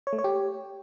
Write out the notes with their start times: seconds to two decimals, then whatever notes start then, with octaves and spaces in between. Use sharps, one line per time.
0.07 C#5
0.13 A3
0.19 C#5
0.24 G4